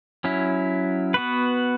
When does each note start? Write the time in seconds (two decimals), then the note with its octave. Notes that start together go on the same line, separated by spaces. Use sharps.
0.24 F#3 C#4 E4
1.14 B3 F#4 B4